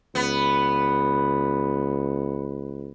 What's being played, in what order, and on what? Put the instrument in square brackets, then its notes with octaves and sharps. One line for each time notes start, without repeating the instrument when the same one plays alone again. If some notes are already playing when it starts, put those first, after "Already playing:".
[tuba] C#2 [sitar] B3